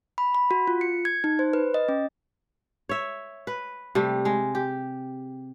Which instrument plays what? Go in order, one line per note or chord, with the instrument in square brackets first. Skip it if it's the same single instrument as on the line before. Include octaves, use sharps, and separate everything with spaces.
[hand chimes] B5
B5
F#4
F4
C#7
G#6
D#4
C5
B4
D#5
C#4
[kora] C#5 E5
B4
C3 G3 A3
G#3
G4